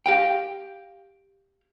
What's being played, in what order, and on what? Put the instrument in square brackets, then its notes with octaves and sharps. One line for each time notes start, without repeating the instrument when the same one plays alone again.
[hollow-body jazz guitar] G4 F5 G5